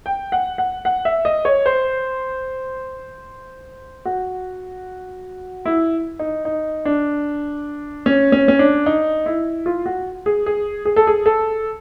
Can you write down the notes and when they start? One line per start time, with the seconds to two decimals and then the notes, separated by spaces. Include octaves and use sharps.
0.06 G5
0.32 F#5
0.58 F#5
0.85 F#5
1.05 E5
1.25 D#5
1.45 C#5
1.66 C5
4.05 F#4
5.65 E4
6.19 D#4
6.45 D#4
6.85 D4
8.06 C#4
8.32 C#4
8.48 C#4
8.59 D4
8.86 D#4
9.26 E4
9.66 F4
9.86 F#4
10.26 G#4
10.46 G#4
10.85 G#4
10.96 A4
11.07 G#4
11.26 A4